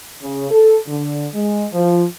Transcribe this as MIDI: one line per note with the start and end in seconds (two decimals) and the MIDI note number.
0.21 0.48 49
0.51 0.76 69
0.86 1.25 50
1.34 1.65 56
1.72 2.04 53